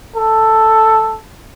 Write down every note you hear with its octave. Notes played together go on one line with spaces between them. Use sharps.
A4